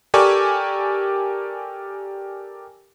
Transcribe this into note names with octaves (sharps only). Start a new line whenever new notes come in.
G4 A4 A#4 D5 G#5 C#6